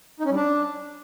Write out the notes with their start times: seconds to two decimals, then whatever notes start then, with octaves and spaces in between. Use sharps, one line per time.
0.20 D#4
0.25 C#4
0.30 G3
0.36 D4